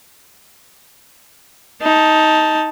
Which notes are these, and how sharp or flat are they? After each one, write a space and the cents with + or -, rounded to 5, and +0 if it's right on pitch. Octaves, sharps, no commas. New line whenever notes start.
D#4 +15 A5 +0